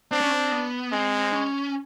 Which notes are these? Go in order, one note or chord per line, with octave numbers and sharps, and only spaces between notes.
C4 D4
C#4
C4
B3
G#3 C4
C#4